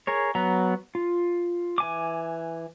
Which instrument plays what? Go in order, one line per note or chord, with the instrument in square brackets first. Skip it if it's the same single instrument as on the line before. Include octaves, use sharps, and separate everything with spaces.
[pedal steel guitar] G#4 A#4 C#5
F#3 B3 A#5
F4
E3 G#5 D6